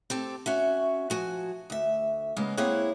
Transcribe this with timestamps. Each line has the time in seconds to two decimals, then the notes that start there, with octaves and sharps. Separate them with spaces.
0.10 C4 G4 A4
0.46 C#4 F#4 E5
1.10 F3 F#4 G#5
1.70 D2 E5
2.36 C#3 G#3 A#3 B3
2.57 A#3 C4 E4 G#4 C#5 F#5